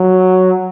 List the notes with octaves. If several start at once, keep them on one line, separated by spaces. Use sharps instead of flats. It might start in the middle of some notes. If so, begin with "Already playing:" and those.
Already playing: F#3